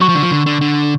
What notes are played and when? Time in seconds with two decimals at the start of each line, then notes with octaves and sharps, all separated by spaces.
0.01 F#3 C#6
0.09 F3
0.15 D3
0.23 F3
0.32 D3
0.46 D3
0.61 D3